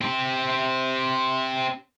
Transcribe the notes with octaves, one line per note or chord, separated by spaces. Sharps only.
C4 G4